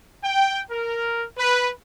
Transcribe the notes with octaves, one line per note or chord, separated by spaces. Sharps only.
G5
A#4
B4